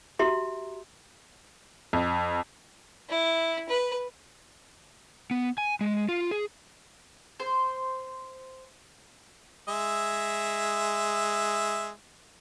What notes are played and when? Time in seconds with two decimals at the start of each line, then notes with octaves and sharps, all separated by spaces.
0.19 F#4 G4 E5 A#5 C6
1.93 F2
3.09 E4
3.69 B4
5.31 B3
5.58 G#5
5.81 G#3
6.09 F4
6.31 G#4
7.40 C5
9.68 G#3 E5